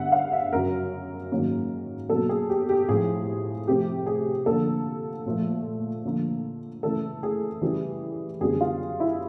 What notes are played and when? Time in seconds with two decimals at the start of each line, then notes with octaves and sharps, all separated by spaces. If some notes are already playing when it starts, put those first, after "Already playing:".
Already playing: G2 D3 G3 B3 E5 F#5
0.12 F5
0.32 E5
0.53 F#2 C#3 F#3 A#4
1.32 G#2 D#3 F#3 A#3 C#4
2.10 B2 F#3 A#3 A4
2.29 G#4
2.50 G4
2.69 G4
2.88 A2 F3 G#3 C4 G#4
3.68 C3 F3 A3 C4 G4
4.06 G#4
4.46 D3 F3 A#3 A4
5.26 A#2 F3 A3
6.04 D3 F3 A#3
6.83 C#3 E3 A3 A4
7.23 G#4
7.61 C#3 E3 G3
8.40 F#2 D3 G3 B3 G#4
8.61 F4
9.00 E4